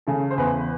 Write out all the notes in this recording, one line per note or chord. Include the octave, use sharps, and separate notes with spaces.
C#3 A4
C5
E2 B4